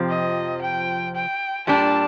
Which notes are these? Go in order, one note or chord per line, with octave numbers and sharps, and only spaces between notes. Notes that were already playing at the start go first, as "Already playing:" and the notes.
Already playing: F2 C3 F3
D#5
G5
G5
A#2 G3 D4 A5